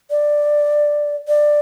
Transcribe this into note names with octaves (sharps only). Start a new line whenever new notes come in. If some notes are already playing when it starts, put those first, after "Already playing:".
D5
D5